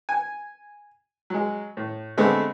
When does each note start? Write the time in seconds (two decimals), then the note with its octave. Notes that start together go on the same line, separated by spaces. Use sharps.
0.09 G#5
1.30 F#3 G#3
1.77 A2
2.17 D3 G#3 A3 B3 C4